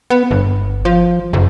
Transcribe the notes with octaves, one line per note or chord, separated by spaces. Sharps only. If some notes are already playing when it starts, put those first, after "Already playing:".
B3
G1
F3
F#1